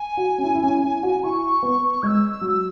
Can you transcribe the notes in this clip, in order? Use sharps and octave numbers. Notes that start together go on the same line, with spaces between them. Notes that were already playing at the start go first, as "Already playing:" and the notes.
Already playing: G#5
F#4
C#4
E4
E4
C#4
E4
F#4
E4 C#6
B3
G#3 E6 G#6
F#3